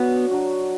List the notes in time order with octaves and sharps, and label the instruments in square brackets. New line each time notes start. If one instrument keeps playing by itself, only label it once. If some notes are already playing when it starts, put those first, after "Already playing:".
Already playing: [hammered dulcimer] F#3 D4 F#4 [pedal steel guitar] B3
[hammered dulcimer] F#3 D4 F#4